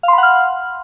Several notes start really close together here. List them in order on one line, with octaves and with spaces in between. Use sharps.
F5 C6 B5 F#5 F6